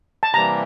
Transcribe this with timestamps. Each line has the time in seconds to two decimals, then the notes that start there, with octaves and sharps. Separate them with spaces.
0.23 A5
0.33 C3 E3 G3 A#3 A#5